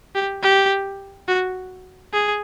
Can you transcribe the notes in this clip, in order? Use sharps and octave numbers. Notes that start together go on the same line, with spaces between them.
G4
G4
F#4
G#4